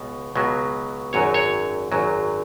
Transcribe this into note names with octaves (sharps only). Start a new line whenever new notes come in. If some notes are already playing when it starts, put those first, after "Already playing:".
Already playing: C#2 B2
C#2 B2 F#3
G#1 F#2 F#3 C#5
C#5
G#1 F#2 F#3